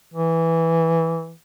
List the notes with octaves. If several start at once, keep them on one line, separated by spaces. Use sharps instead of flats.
E3